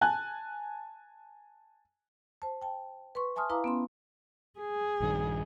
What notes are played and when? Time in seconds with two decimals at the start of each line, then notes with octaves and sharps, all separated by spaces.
0.01 G#5 A5 F#6
2.42 C5 A5
2.62 G5 A5
3.15 B4 C6 C#6
3.36 E5 G#5 A5 C6 D#6 F6
3.50 E4 B4 F5 A#5 D6 D#6
3.64 B3 C#4 C6
4.59 G#4
5.00 A#1 G2 D#3